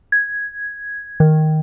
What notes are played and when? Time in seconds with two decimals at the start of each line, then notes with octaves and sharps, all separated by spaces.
0.12 G#6
1.20 D#3